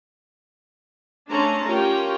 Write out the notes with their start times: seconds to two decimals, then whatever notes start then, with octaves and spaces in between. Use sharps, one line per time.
1.29 A3 C#4 D4 A5 A#5 C6
1.64 C#4 F4 G4 A#4 G5